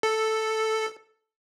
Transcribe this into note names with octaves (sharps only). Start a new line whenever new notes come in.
A4